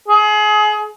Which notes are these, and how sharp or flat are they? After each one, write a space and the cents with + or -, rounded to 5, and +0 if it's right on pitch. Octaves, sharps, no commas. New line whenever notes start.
G#4 +30